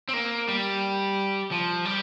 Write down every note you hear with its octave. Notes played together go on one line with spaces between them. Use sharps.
C4
A#3
G3
F3
G3